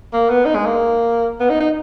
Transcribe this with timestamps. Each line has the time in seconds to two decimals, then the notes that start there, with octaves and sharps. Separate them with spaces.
0.13 A#3
0.30 B3
0.45 D#4
0.55 G#3
0.66 A#3
1.40 B3
1.50 D#4
1.60 D#4